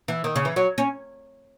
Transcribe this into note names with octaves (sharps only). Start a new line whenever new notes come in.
E3
D#3
C#3
E3
F#3
C#4